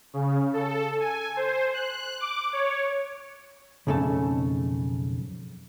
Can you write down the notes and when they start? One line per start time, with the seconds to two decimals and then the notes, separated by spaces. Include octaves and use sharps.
0.14 C#3
0.53 A4
1.00 G#5
1.36 C5
1.74 F#6
2.20 D6
2.53 C#5
3.87 B1 F2 C#3 A3 A4 A5